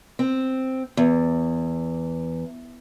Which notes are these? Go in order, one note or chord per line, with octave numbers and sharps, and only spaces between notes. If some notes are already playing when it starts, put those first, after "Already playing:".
C4
E2